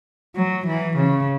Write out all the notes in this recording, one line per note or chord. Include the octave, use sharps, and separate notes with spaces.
F#3
E3
C#3